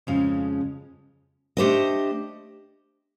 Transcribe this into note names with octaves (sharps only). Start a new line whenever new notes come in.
F2 C#3 F3 G#3 C#4
A3 D4 G4 C5 D#5